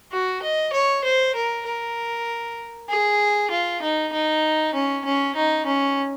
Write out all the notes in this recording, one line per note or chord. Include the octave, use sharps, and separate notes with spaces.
F#4
D#5
C#5
C5
A#4
A#4
G#4
F4
D#4
D#4
C#4
C#4
D#4
C#4